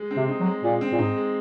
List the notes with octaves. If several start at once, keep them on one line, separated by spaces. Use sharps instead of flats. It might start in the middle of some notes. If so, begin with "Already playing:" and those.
Already playing: G#3
C4
C3
D#4
F#3
G#3
A#2 G#3
C4
A#2
G#2 D#4
G#3